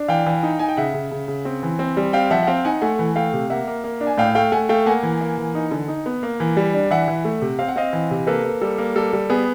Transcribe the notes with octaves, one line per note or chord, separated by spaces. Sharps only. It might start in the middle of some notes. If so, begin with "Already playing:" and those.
Already playing: D4
E3 F5 G5
E3
D#4
D#4 G#5
G5
C#3 E5 F#5
C#3
C#3
C#3
C4
E3
C4
G3
C4 F5 G5
F3 E5 F#5
F#5
C4 F5 G5
D#4 F#5 G#5
A3 F#5 G#5
E3
A3 F5 G5
C3
A#3 E5 F#5
A#3
A#3
D4
G#5
A2 F5 G5
A3 F5 G5
A3 F#5 G#5
A3 F5 G5
A#3 F#5 G#5
E3
A#3
E3
D#4
D3
D#4
B3
A#3
E3
G3
D4
E3 E5 F#5
E3
A3
C3
C4 F5
F#5
C4 D#5 F5
E3
C3
A#3 A4 B4
A#3
G3 A4
A#3
G3 A4
G3
B3 G#4